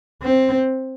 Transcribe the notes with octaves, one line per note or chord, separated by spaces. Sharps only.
C4